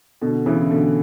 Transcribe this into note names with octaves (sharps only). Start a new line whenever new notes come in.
B2 D3
C#3 E3
B2 D3